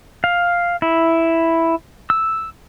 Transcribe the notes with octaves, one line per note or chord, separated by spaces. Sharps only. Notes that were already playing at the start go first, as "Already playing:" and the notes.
F5
E4
E6